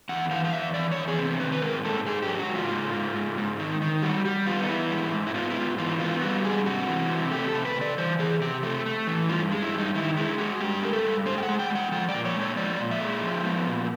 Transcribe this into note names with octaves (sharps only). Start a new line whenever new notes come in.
E2 F#5
E3 F5
F5
E2 E5
E3 D5
E2 C#5
G#4
C3
D#3 B4
B4
G#2 A#4
G#2 A4
G#2 G#4
G4
F#3
F#4
G#2
F4
G#2
G#2
G#2
G#2
D#3
D#3
G3 F#4
G3
B3 F4
D#4
E3 E4
G#2
G#2
E4
B3 F4
E4
G#2 F4
E3 F4
B3 F4
G3 F#4
G#2 G#4
C3 F#4
E3
C3
A3 G4
C3 A4
B4
C3
D5
E3 C5
E3 G#4
C3 G4
A3
A3
E3
G2 F4
G#3
E4
G2
D#4
D#3 E4
G#3 E4
G#3 F#4
G2 G4
G#3 A#4
A4
G2
G#3 C5
G5
F#5
G#3
G5
G#3
F#5
F3 G5
D5
A#2
C#5
G#3
C#5
F3 D5
A#2
E5
G#3
F3
B3
A#2